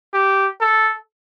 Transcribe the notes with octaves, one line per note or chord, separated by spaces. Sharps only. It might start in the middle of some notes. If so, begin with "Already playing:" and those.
G4
A4